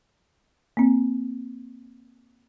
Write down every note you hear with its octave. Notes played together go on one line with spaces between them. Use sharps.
A#3 C4